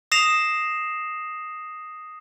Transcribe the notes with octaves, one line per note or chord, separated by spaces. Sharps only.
D#6 A#6 C7 E7 F7